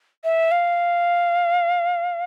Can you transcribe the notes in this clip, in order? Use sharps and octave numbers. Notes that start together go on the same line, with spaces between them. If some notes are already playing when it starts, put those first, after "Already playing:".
E5
F5